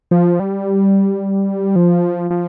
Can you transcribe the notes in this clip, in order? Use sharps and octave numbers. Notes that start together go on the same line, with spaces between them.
F3
G3
F3
F3